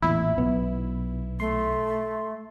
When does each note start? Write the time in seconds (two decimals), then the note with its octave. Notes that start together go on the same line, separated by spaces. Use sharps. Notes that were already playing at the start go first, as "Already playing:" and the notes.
0.02 A1 E2 A#2 E4
0.38 B1 B3
1.40 A3 C6